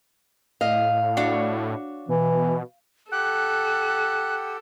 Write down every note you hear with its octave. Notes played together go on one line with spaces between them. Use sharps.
A2 D#5 F5
D4 F#4 C#5
B2 E3
G4 A4 F#5 G5 F#6